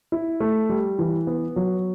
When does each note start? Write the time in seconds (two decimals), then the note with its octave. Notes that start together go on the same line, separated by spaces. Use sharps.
0.12 E4
0.40 A3
0.69 G3
0.99 E3
1.27 B3
1.56 F#3